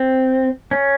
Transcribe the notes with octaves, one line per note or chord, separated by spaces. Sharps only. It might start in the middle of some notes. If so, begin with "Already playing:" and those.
Already playing: C4
C#4